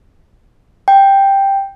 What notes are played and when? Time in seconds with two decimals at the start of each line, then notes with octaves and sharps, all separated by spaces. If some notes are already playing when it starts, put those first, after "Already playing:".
0.88 G5